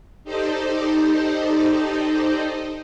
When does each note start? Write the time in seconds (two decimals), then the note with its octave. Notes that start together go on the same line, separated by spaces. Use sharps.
0.24 D#4 G4 A4 C5 D5 D#5